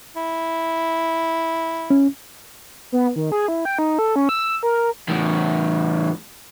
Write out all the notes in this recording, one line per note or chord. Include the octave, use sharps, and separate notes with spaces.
E4
C#4
B3
D#3
G#4
E4
G5
D#4
A4
C#4
E6
A#4
E2 A2